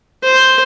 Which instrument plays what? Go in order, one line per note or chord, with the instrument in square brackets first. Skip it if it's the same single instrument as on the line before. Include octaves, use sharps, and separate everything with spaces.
[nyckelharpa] C5